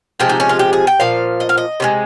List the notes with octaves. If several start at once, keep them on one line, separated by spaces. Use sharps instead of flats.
C3 F3 G#3 G4
D#4
C#4
F4
G4
G#4
G5
A#2 F3 F5
D#5
F5
D#5
C3 F3 G#3